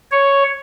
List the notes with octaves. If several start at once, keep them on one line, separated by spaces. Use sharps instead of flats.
C#5